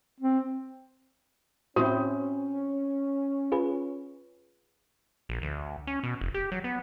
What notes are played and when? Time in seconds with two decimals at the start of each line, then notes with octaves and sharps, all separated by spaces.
0.20 C4
1.76 A2 C4 C#4 E4 F#4 C5
3.52 F4 G#4 B4
5.29 A#1
5.42 D2
5.87 C#4
6.03 B2
6.21 F1
6.34 G4
6.52 F#3
6.64 B3